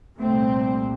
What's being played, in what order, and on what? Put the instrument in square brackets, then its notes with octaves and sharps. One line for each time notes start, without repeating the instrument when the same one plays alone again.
[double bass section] C2 A#2 A3 C4